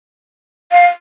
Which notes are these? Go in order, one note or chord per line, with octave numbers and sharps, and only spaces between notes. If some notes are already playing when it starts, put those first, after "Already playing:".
F5